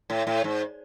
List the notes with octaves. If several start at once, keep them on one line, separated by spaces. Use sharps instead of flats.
A2
A2
G#2